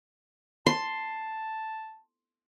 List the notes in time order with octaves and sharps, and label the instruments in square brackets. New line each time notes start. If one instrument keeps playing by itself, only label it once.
[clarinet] A5 [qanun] C6